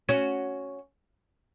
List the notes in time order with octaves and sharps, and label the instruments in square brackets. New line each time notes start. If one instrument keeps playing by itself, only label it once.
[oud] C#4 F#4